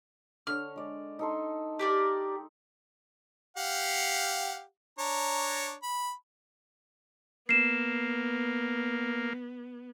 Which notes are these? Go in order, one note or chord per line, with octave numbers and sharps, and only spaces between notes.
D3 C#5 F6
G#3 D5
D#4 A4 C6
G4 A#4 D5
G4 F5 F#5
D4 C#5 A#5
B5
A#3 B3 C7 E7